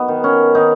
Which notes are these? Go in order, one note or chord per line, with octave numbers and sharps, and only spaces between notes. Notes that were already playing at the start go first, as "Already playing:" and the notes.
Already playing: F#3 B3 D#4
D#3
C#4
D#3 D#4